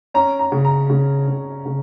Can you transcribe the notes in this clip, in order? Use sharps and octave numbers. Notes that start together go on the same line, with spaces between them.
C#4 A#5
A#5
C#3
A#5
C#3
C#3
C#3